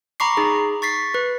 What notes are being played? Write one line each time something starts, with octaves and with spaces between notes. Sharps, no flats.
A#5 B5 C#6 D6 C7
D#4 G#4
C#6 A6 B6 C7
B4